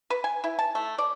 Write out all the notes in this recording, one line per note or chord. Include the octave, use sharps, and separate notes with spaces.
B4
G#5
E4
A5
A3
D5